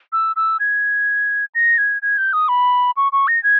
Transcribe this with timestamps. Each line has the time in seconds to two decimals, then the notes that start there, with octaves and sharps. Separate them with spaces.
0.13 E6
0.36 E6
0.60 G#6
1.55 A#6
1.78 G#6
2.02 G#6
2.18 G6
2.33 D#6
2.48 B5
2.97 C#6
3.12 C#6
3.28 A#6
3.43 G#6